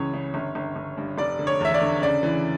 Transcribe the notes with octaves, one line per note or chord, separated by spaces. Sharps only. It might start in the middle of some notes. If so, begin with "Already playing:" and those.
Already playing: C#2 C#3 E3 C#5
C#3
G1
G1
G1
G2
F1 D5
D3
C#5
E2 E5
D5
D3
C#3 D5
E3